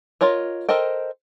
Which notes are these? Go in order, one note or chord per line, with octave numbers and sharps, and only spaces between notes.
F4 A#4 C#5 D#5
A4 A#4 C5 D#5 G5